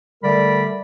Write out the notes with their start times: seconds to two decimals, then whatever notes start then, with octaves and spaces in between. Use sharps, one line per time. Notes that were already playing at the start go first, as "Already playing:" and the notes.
0.23 D3 G3 A3 A#4 D5 B5